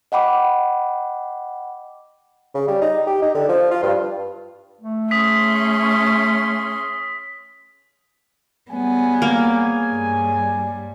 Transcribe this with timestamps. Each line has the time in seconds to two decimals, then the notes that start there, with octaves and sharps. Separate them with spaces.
0.12 D#5 F#5 G5 B5 D6
2.55 C#3
2.68 G3
2.82 D#4
3.07 G4
3.22 D#4
3.35 D3
3.49 F3
3.71 F4
3.83 G2
4.81 A3
5.11 C#4 G#4 C6 D#6 B6
8.71 G3 B3 G#4 C#5 G#5
9.22 A#3
9.93 G2 G3